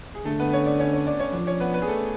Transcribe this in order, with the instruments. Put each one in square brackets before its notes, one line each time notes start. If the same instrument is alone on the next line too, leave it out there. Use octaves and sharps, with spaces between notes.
[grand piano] G#4
[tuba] D3 [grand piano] A3 A4
[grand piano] B3 B4
C#4 C#5
D4 D5
C#4 C#5
C#4 C#5
D4 D5
C#4 C#5
[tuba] F3 [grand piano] D4 D5
[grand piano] C#4 C#5
B3 B4
B3 B4
G#4
A3 A4